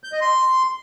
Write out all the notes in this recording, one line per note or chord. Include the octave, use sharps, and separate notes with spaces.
G6
D#5
C6